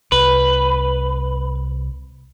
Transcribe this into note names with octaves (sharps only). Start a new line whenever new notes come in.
C2 B4